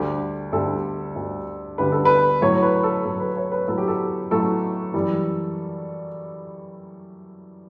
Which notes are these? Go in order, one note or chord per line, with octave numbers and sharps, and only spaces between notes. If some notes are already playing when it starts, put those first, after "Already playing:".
Already playing: D2 D3 G3 G4
D2 D3 G3 A4
D2 D3 G3
D2 D3 G3 B4
A4
B4
A2 F#3 A3 C#5
B4
A4
A2 F#3 A3 A4
B4
C#5
B4
A2 F#3 A3 A4
G4
A4
A2 F#3 A3 A4
F#2 E3 G3